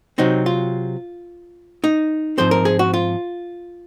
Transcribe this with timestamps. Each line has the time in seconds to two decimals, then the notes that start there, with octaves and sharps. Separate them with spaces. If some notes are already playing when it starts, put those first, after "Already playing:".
0.18 C3 F#3 C4 D#4
0.46 F4
1.84 D#4
2.38 G#2 F3 C4 C5
2.51 A#4
2.65 G#4
2.79 F#4
2.94 F4